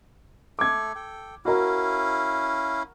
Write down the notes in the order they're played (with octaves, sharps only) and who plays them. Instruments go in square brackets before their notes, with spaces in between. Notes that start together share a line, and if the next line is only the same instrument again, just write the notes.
[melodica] A3 A4 [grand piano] D6 G#6
[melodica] A4 G5
[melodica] C#4 E4 F5 [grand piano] F#4 A#4